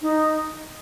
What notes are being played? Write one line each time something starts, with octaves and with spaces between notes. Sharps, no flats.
D#4